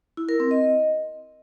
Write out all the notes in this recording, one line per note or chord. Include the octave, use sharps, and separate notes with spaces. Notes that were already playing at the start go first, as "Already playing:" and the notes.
E4
A#4
C4
D#5